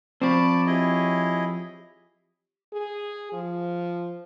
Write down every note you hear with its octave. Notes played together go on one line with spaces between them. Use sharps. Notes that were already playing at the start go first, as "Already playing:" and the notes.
F3 C4 D5 A5 B5 C#6
E4 G4 G#4 C#5 D#5
G#4
F3